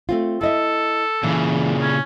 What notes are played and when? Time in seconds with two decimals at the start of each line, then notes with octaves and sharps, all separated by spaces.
0.09 A3 C4 F4
0.41 E4 A4 D#5 E5
1.24 A#2 C#3 E3
1.82 C#4